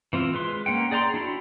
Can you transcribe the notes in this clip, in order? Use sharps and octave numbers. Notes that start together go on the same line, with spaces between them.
E3 C4 F4
G#3 B4 C6
A#3 C#4 F#5 G5
G#4 D5 G5 A#5 C6
D4 E4 F#4 B5